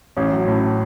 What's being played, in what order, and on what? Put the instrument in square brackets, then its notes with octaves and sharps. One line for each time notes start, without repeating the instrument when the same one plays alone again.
[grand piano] A1 C#4
F#3
A2